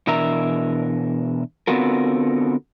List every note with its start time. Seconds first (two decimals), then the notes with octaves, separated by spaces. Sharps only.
0.07 B2 E3 D4 A#4 E5 A#5
1.67 D3 B3 C4 F4 F#4 A#4